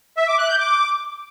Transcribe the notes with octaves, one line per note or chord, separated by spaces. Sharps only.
E5
D6
F#6
G6
D6